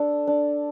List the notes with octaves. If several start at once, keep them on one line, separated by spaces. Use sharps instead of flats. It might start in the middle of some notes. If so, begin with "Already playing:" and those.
Already playing: D4 A4
D4